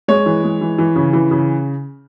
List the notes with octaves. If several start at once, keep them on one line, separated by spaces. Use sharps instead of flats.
G#3 C#5
E3
G#3
E3
E3
C#3
E3
C#3